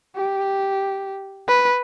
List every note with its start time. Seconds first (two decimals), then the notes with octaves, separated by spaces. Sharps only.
0.16 G4
1.48 B4